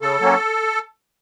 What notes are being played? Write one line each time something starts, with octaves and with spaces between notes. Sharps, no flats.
C#3 A4
F#3 A#3 C#4